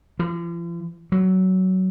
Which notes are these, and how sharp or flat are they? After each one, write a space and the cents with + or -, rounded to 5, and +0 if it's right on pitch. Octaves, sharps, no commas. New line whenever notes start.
F3 -45
F#3 +15